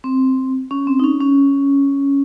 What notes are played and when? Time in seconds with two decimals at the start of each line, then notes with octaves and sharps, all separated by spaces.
0.04 C4
0.71 C#4
0.87 C4
1.00 D#4
1.04 C#4
1.21 C#4